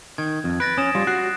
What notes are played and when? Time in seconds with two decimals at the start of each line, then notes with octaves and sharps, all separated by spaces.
0.18 D#3 G#6
0.44 F2
0.60 B4 A6 A#6 D7
0.78 C#4 D#6 E7
0.95 G3 F4
1.07 F#4 F#6 C7